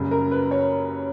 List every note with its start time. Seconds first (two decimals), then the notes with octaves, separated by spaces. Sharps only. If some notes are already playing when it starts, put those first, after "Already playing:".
Already playing: F#1 F#2 C#3 G3
0.11 A#4
0.31 B4
0.51 C#5